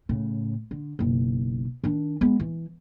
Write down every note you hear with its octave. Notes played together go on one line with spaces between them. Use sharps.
A2 C#3
D3
F#1 B1
D#3 D4
G#3 B3
E3